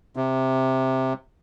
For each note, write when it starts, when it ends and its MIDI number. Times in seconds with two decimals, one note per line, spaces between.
0.16 1.13 48